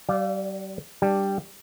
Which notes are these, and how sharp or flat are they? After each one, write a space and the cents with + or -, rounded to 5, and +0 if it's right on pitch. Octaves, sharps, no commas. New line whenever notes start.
G3 -40 D5 +0 F5 +0
G3 +0 D4 +0 G4 +0